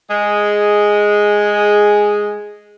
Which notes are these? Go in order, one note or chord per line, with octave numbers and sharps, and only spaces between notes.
G#3 G#4